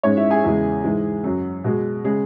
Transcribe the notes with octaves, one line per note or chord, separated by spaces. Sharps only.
G#2 G#3 C#4 C#5
E4 E5
G#4 G#5
E2 C#3 E3 G#3
G#2 E3 G#3
F#2 F#3
B2 G#3
C#3 G#3 G#4